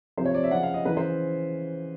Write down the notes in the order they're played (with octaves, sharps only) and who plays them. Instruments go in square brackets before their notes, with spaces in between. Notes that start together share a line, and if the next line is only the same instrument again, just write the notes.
[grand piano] C3 F3 C5
C#5
D5
E5
C#3 F3 F#5
F5
D#5
C#3 E3 B4
C5